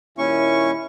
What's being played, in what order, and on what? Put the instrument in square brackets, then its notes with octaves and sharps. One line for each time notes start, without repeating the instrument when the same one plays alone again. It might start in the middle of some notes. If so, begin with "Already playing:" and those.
[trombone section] D#2 A#2 E4 [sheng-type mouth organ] C#4 C#6